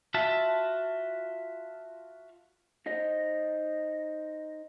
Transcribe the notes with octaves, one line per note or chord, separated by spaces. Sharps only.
F4 F#4 E5 A5
D#4 C5 D#5